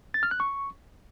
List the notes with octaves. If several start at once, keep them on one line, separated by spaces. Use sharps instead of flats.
A6
F6
F#6
C#6